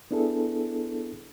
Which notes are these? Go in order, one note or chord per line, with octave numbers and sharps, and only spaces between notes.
B3 D4 E4 G#4 A4